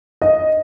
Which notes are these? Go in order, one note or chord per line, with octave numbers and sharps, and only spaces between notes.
D#5